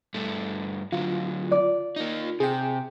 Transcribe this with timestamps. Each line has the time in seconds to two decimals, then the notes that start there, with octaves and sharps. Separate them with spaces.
0.14 G2 A3
0.92 D3 F#3 F4
1.51 D5
1.96 A#3 D#4
2.40 C3 G#4 G5